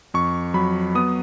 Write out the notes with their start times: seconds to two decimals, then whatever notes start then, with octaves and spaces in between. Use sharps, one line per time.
0.14 F2 C#6
0.54 F#3 B5
0.95 B3 D#6